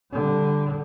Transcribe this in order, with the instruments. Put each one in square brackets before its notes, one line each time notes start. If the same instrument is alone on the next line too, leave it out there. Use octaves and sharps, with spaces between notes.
[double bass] D3 G3